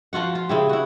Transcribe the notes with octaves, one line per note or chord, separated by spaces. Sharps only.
F3 F4 F#4 F#5
F4
C#3 E4 G4
E4 F#4